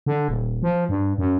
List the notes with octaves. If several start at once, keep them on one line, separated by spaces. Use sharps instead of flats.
D3
D#1
F3
G2
F#2